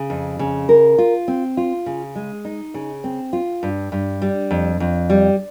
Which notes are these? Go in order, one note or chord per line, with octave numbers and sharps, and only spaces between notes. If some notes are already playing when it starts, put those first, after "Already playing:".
Already playing: C#3
F2
C#3
A#4
F4
C4
F4
C#3
G#3
D#4
C#3
C4
F4
G2
G2
G3
F2
F2
G3